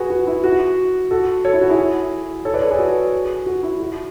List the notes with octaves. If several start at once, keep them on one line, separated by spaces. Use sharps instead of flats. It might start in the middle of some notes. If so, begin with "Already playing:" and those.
Already playing: F#4 G#4 B4
F#4
E4
F#4
F#4 A4
A4 C#5
E4
F#4
E4 G#4
A4 C#5
B4 D5
A4 C#5
G#4 B4
F#4
F#4
E4
F#4